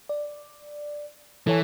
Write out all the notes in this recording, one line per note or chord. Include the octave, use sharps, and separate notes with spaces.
D5
E3 A4 C#5 G#5